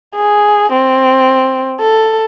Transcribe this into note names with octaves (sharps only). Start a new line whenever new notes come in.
G#4
C4
A4